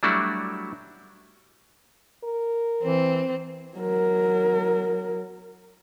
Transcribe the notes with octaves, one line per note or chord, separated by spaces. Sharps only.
F#3 G3 A3 D4 E4 F#4
A#4
E3 C4
F#3 A#4